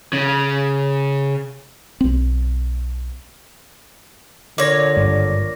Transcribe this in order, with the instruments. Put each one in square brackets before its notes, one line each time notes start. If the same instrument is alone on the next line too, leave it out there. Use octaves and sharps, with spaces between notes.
[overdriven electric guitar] C#3
[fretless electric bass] B1 C4
[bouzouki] A#2 C#5 [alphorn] D3 [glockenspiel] D6 A#6
[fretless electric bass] G#1 G2